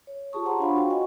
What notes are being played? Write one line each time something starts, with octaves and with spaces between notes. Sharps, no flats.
C#5
F4 G4 G#4 A5 C#6 D#6
C5 F#5 A#5 C6 C#6
D4 F4 C#5 F5 B5
F#4 F5 G5 C#6
F#4 D#5 F#5 G#5